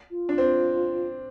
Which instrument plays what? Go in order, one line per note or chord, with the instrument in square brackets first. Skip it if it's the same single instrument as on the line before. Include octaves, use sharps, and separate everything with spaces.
[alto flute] F4
[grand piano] D4
C4